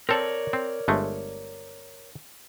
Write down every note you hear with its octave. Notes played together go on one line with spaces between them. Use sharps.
C4 A4 A#4 C#5 D5
C4
G1 G#3 A3